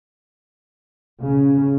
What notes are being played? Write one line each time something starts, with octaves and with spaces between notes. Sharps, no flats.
C#3